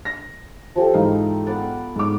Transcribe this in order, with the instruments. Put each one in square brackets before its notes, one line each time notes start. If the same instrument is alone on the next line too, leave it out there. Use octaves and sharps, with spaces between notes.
[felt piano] A#6
[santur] F3 G4 A4
[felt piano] G#2 E3 F5 [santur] D#4
[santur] B3 D5 F#5
[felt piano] G#2 D6